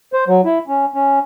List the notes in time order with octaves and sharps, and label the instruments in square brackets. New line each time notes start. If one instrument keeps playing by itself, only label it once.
[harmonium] C5
F#3
E4
C#4
C#4